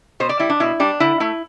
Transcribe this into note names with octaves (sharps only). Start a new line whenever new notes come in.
B2 C5
D5
G3 E4
D4
B2 E4
G3 D4
D3 E4
A3 E4